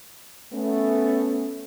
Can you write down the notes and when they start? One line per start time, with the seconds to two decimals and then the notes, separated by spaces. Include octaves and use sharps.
0.52 A3 B3 C#4